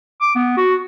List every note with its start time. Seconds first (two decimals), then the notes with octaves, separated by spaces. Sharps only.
0.21 D6
0.35 B3
0.57 F#4